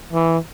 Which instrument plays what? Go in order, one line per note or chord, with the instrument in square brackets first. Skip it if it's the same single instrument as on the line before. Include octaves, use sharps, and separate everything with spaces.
[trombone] E3